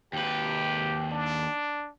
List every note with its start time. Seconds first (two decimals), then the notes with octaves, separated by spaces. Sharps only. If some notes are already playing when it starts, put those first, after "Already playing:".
0.13 D#2 G4 B4
1.12 D4